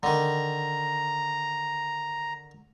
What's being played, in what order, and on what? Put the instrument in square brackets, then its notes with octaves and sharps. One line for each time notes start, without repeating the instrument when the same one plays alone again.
[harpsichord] D3 D#3 [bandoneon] A#5